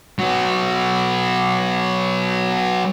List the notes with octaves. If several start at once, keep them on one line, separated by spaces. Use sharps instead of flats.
F#3 B3